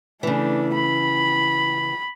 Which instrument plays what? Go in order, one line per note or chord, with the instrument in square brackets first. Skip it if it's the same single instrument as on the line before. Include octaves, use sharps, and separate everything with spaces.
[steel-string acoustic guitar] C#3 E3 [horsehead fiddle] A3 D4
[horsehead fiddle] B5